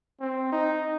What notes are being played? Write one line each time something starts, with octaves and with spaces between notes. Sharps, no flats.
C4
D#4